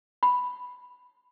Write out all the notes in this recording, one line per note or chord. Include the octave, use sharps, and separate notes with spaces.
B5